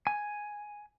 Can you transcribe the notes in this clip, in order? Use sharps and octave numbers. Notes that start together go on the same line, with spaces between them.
G#5